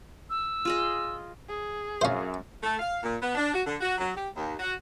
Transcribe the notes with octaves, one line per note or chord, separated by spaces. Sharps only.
E6
F4 G#4 D#5
G#4
F#2 C#4 C5 E5 F5
A3
F5
A#2
B3
D4
F#4
D3
F#4
F#3
G4
D#2
F#4